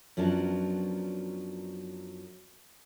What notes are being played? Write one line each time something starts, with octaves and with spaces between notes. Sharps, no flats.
F#2 F3 F#3 B3 D4